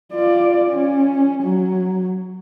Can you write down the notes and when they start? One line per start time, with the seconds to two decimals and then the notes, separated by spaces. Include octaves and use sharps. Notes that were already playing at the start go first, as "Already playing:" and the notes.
0.14 F4 D5
0.70 C#4
1.43 F#3